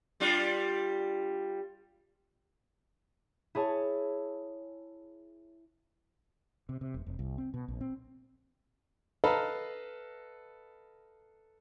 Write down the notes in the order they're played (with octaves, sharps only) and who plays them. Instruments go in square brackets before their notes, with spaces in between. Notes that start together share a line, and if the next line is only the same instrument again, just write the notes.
[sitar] G3 D4 F4
[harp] E4 G#4 C#5 A5
[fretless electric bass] C3
C3
E1
F1
C2
C4
B2
A#1
C4
[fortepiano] A4 B4 D#5 F5 A#5 B5